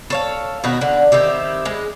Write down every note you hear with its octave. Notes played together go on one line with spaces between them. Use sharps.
A4 C#5 F5
B2 D#3 D#4 F#4
D3
D#3 C4 E4 G4
G#3